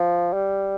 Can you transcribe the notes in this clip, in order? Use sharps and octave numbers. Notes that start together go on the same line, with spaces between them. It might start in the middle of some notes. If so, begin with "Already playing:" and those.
Already playing: F3
G3